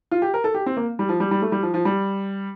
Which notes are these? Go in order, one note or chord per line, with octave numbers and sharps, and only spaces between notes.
F4
G4
A#4
A4
G4
C4
A#3
G3
F3
G3
G3
A3
G3
F3
F3
G3